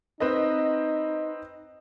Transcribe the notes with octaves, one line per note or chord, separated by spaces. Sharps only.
C4 D#4 B4 D#5